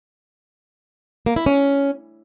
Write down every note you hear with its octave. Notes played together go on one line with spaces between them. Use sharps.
A#3
E4
C#4